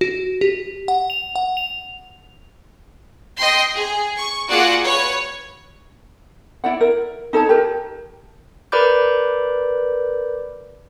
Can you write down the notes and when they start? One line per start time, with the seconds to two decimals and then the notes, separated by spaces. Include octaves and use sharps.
0.01 F#4
0.41 G4
0.88 F#5
1.10 F7
1.36 F#5
1.57 F7
3.38 D#5 G5 C6
3.75 G#4
4.17 C#6
4.49 A#3 F4 F#4 G#4 D5 F#5
4.84 B4 C#5
6.64 E4 D5 F#5
6.81 A#4
7.33 D#4 A4 C#5 A5
7.49 G4 A#4
8.72 A#4 B4 D5 B5 D6 G6